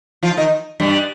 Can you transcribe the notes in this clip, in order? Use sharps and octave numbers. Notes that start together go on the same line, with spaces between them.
F3 F4
D#3 D#4
G2 G3